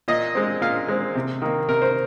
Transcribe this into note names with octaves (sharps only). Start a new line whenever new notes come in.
A#2 D#5
G#3 C4
A#2 F5
G#3 C4
C3
D#3 A#3
C3 A#4
C5